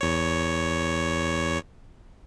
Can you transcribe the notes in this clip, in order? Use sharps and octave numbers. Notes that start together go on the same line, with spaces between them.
E2 C#5